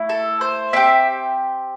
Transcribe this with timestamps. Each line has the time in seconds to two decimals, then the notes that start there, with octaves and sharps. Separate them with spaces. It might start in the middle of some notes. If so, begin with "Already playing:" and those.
Already playing: A3 E4
0.09 A4
0.41 C5
0.73 C4 G4 E5